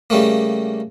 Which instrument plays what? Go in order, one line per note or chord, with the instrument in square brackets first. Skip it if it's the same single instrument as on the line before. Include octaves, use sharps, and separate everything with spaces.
[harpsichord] C#3 G3 A3 A#3